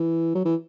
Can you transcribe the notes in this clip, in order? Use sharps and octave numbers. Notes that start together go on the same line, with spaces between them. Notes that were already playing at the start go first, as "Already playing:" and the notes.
Already playing: E3
F#3
E3